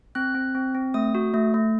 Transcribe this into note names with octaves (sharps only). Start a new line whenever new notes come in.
C4 F#6
C4
C4
C4
A3 D#6
F#4
A3
A3